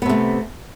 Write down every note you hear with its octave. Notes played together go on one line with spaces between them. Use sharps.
C3 A3 B3